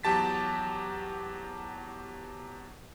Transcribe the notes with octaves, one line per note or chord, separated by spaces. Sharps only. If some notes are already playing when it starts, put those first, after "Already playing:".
E2 F#3 G4 A5 A6 B6